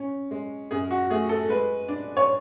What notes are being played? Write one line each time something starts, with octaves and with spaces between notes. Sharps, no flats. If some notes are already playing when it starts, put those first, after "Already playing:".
Already playing: C#4
G#3
F#2 G#4
F#4
A3 G#4
A4
G#3 B4
D4
C#5